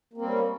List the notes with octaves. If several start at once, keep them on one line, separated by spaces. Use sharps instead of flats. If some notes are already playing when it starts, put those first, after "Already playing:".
G3 A#3 C4 C#4